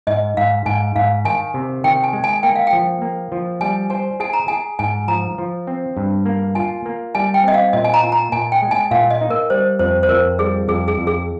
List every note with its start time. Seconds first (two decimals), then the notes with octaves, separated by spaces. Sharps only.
0.07 G#2 D#5
0.37 G#2 F5
0.66 G#2 G#5
0.95 G#2 F5
1.25 D#3 G#5
1.54 C3
1.84 D#3 G5
2.04 G#5
2.13 G#3
2.24 G#5
2.43 A#3 G5
2.56 F5
2.67 G5
2.73 F3
3.02 A#3
3.32 F3
3.61 G3 G#5
3.90 C5 G#5
4.20 G#4 G#5
4.33 A#5
4.48 G#4 G#5
4.79 G#2 G#5
5.08 F3 A#5
5.38 F3
5.67 C4
5.97 G2
6.26 A#3
6.55 F4 G#5
6.86 A#3
7.15 G3 G#5
7.34 G5
7.44 C4 D#5
7.54 F5
7.73 A#2 D#5
7.84 G#5
7.94 A#5
8.03 F4
8.12 A#5
8.32 A#2 G#5
8.52 G5
8.62 G#3
8.71 G#5
8.91 A#2 F5
9.10 D#5
9.21 D#4
9.30 A#4
9.50 G3 C5
9.79 F2 C5
10.03 C5
10.09 F2 A#4
10.38 G3 G#4
10.68 F2 G#4
10.88 G#4
10.98 F2
11.07 G#4